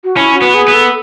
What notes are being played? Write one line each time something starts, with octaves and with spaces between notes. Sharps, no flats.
F#4
C#4 E4
F#4
B3
G#4
B3
A4